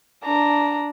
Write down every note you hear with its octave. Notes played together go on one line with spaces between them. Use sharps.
D4 A#5